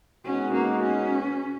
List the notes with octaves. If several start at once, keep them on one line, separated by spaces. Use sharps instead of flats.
B2 G#3 C#4 D#4 F#4
A#3
C#4